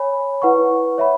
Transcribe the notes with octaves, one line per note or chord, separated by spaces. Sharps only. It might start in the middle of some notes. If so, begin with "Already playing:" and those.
Already playing: C#5 G#5 B5
E4 B4 F#5 C#6
C#5 E5 B5